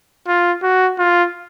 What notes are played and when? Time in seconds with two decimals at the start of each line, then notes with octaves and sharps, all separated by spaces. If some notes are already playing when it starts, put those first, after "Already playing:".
0.27 F4
0.63 F#4
0.99 F4